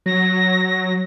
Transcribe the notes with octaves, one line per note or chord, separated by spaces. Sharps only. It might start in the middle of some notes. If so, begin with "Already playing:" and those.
F#3 A#6